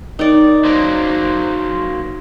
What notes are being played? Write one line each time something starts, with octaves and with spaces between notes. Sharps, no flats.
D#3 D#4 D5
F#3 A#3 C5